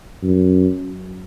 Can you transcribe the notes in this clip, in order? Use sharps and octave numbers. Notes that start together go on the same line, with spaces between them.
F#2